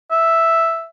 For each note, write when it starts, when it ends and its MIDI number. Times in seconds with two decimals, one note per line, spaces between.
0.11 0.85 76